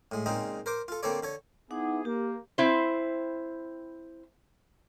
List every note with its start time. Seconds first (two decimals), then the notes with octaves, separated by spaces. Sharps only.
0.12 A2 G#3
0.26 A#2 C#3 G#3 C4 D#4
0.66 A#4 C5 D6
0.88 F4 A4
1.03 D3 A#3 C4 A4 C#5 D5
1.23 D3 A4 C#5
1.71 B3 D#4 E4 G#4 F#5 D6
2.05 A#3 G4
2.58 C4 E4 C5